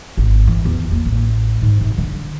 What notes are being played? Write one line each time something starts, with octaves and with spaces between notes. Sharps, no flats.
G#1
E3
E2
A#3
A1
G#2
C3
D3